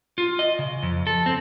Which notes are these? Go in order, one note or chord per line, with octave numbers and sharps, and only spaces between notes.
F4
D#5
C#3
F2
A4
C4